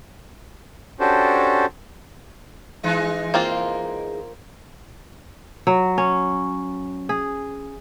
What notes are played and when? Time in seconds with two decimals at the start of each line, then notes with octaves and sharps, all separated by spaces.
1.00 C#4 D4 F#4 G4 A4 C5
2.83 E3 G#3 D#4
3.34 A#3 C4 F4
5.67 F#3
5.98 C#4
7.09 G#4